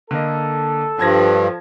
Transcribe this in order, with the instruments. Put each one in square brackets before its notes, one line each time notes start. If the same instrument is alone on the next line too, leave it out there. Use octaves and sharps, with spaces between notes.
[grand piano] D3 A#3 D#5 [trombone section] A4
[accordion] G2 [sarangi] F3 [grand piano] A5 G#6 A#6